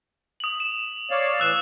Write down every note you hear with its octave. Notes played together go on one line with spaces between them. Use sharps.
D#6 F#7
E7
C#5 D5 F5
A2 E3 E6 F#6 E7